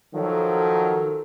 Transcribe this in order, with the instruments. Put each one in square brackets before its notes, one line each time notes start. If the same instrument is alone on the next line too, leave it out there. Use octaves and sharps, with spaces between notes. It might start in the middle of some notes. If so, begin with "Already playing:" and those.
[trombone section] D#3 F3 F#3 [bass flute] A4